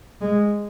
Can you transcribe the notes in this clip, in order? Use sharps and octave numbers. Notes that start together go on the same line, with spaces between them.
G#3